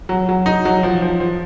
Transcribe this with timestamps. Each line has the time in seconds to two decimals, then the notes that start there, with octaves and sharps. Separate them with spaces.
0.09 F#3
0.29 F#3
0.46 D#4
0.65 F#3
0.83 F3
1.02 F3
1.20 F3